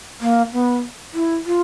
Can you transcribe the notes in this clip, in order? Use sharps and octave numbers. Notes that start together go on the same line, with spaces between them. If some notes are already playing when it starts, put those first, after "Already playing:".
A#3
B3
E4
F4